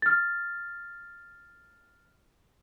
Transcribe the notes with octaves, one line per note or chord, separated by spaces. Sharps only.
F6 A6